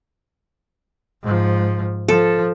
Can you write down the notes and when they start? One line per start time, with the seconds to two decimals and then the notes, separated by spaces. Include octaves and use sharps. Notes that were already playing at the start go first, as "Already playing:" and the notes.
1.23 G#2 F3
2.08 F3 A4